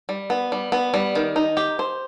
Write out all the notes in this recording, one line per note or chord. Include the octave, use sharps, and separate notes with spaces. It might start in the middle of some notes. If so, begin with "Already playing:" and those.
G3
B3
G3
B3
G3
D#3
D#4
G4
C5